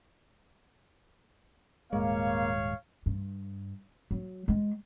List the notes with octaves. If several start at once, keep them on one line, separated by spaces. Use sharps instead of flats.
D#1 G#2 G#3 A#3 C#5 F5
G2
F#3
G#3